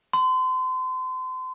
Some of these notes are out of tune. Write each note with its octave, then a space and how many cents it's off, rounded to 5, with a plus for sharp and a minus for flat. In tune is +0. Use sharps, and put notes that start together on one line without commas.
C6 -35